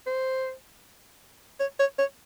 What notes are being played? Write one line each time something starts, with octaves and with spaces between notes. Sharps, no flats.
C5
C#5
C#5
C#5